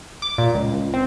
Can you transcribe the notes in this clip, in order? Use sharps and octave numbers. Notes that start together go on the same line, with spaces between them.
D6
A#2
C#2
C#2
C4